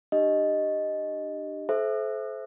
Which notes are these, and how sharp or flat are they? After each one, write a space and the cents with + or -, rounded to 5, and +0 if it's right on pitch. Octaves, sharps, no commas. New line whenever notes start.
D4 +35 G4 +0 D#5 +0
A4 -40 C5 +0 E5 +0